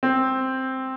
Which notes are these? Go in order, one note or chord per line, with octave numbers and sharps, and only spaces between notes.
C4